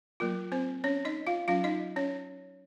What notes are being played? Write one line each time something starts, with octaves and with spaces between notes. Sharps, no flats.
F#3 A#3 F4 A#4
C4 C5
C#4 C#5
D#4 D#5
F4 F5
F#3 C#4 F4 F5
D#4 D#5
C#4 C#5